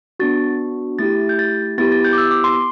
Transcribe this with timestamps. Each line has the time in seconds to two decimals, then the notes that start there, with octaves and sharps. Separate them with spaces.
0.20 B3 D4 F#4 A6
0.99 A3 E4 G4 A6
1.29 G6
1.39 A6
1.78 B3 E4 G4 A6
1.92 A6
2.05 G6
2.13 D6
2.18 E6
2.31 D6
2.44 C6